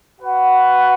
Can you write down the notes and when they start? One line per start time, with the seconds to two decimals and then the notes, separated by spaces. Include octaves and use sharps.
0.21 F#4 B4 F#5